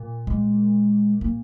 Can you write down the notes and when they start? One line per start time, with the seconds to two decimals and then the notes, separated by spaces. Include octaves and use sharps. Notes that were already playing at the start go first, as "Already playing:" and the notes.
Already playing: A#2
0.27 G#3
1.21 A#3